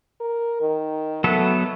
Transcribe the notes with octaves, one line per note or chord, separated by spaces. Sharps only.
A#4
D#3
F#3 A3 B3 A4